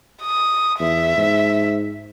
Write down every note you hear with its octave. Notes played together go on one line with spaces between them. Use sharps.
D#6
E2 E5
G#2